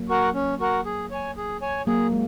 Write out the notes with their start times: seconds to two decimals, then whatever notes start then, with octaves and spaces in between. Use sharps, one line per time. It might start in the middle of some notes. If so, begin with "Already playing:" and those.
Already playing: F#3 A#3
0.09 F#4 A#4 F#5
0.34 C#4
0.60 F#4 A#4 F#5
0.85 G#4
1.11 C#5 G#5
1.37 G#4
1.62 C#5 G#5
1.87 F#3 A#3 G#4
2.12 G#3